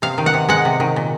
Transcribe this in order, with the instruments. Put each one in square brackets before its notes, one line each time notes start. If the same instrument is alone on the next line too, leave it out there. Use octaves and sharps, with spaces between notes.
[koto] C3 F5
D#3
F#5
C3
G#3 F#5
C3
D#3
A#2